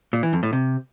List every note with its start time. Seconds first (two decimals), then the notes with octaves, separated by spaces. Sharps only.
0.13 A#2
0.23 E3
0.33 F2
0.43 A2
0.53 C3